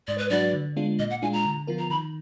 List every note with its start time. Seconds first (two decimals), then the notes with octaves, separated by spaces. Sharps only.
0.08 G#2 D5
0.18 B4
0.30 F#3 D4 F#4 B4 D5
0.53 D3
0.76 G#3 B3 D4 F4
0.99 A#2 D#5
1.10 F#5
1.22 G#3 D4 F4 G#5
1.33 A#5
1.45 D3
1.67 F3 B3 F4 A#4
1.79 A#5
1.90 D#3 B5